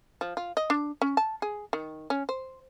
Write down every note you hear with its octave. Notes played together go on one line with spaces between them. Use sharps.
F3
F4
D#5
D4
C#4
A5
G#4
D#3
C#4
C5